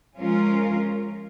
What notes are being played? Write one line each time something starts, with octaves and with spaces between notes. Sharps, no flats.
F3 G#3 C#4 F4 A#4